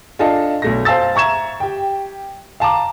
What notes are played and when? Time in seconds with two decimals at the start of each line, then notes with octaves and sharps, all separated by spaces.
0.19 D4 F4 A4 D#5 F5 A5
0.62 B1 A3 A#6
0.85 C5 F5 A5 E6 A6
1.15 E5 A#5 C#6 G#6 E7
1.60 G4 G5
2.60 F5 A5 A#5 D6